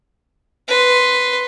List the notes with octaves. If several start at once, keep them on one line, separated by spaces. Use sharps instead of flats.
B4 C6